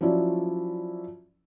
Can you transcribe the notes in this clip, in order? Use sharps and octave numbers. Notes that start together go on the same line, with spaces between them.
F3 F#3 C#4 E4 D5